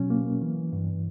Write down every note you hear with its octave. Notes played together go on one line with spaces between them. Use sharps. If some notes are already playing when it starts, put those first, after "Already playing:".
Already playing: B2 F#3 C#4
A#3
E3
G2